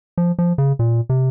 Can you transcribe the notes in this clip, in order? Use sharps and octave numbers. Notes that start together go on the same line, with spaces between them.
F3
F3
C#3
A#2
C3